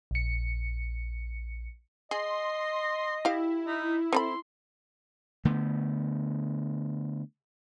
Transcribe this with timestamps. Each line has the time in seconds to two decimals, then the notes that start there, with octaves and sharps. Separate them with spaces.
0.11 A#1 C#7
2.11 G#4 D#5 C6
3.25 E4 G4 F5
3.66 D#4
4.13 C4 A4 B5 C6
5.45 D3 A3 B3